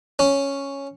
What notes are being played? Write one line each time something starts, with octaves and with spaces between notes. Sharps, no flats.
C#4